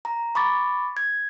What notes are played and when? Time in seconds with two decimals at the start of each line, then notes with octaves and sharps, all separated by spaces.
0.05 A#5
0.35 B5 C#6 D6 A6
0.97 G#6